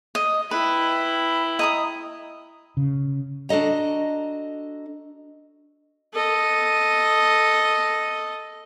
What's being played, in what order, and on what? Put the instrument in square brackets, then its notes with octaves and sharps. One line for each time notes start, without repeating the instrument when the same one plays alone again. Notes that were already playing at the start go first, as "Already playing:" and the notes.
[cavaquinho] D#5
[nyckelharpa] E4 G5 [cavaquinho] B4
[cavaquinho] D#5 A#5 D#6
[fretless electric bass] C#3
[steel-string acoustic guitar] D4 F#4 A4 D#5 A#5
[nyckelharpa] A4 D#5